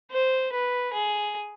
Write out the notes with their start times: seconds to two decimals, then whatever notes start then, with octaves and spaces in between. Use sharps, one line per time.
0.11 C5
0.52 B4
0.93 G#4